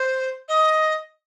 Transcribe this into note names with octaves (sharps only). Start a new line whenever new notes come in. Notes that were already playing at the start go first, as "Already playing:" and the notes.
Already playing: C5
D#5